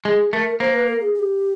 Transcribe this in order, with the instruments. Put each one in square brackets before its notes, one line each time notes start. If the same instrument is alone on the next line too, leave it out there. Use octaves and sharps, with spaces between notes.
[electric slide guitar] G#3 [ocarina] G#4
[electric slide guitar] A3 [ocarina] A#4
[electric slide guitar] A#3 [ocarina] C5
[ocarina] B4
A#4
G#4
G#4
G4